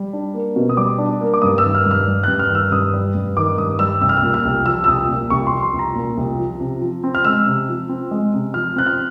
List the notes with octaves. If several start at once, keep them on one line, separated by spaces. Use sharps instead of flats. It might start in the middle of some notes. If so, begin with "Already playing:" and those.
Already playing: G3
D4
A#3
B2
D#6
G3 D6
D4
A#3
D6
G2 D#6
E6
D#3
F6
G2
F6
G3
G2 F#6
F6
D#3
E6
G2 D#6
G3
G2
D#3 D6
G2 D#6
G3 E6
C2 E6
F6
E6
A#2
F6
C2
F3 E6
E6
C2 D#6
A#2
C2 C#6
F3 C6
C6
C2
A#5
A#2
C2
F3
C3
F3
C4
F6
G#3 E6
C3
F3
C4
G#3
C3
F3 F6
C4 F#6
F6